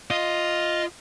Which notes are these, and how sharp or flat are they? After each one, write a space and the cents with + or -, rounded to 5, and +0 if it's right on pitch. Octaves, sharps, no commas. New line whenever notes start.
F4 +0 D#5 +0